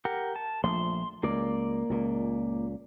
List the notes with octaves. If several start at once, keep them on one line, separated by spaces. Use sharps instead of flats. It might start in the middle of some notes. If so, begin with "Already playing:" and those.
G4 A#4 F#5
A5
A#1 F3 A3 C6
C#2 A#3 D5
C#2 A#2